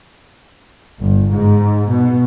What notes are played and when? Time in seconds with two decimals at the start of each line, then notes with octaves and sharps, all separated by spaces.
1.00 G1
1.30 G#2
1.89 B2